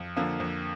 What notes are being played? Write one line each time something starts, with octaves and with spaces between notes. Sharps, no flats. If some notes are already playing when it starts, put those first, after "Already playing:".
Already playing: F2
D3 F3 A#3
F2